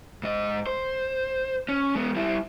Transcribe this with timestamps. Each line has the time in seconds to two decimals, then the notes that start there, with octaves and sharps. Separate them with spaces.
0.23 G#2 D#5
0.67 C5
1.69 C#4
1.95 G#3 B3
2.16 G3 E4